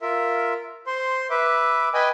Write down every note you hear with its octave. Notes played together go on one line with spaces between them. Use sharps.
F4 A#4 E5
C5 C6
B4 E5 D6
B4 D#5 G5 G#5 B5